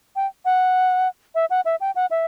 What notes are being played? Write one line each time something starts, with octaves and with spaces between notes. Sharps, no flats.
G5
F#5
E5
F#5
E5
G5
F#5
E5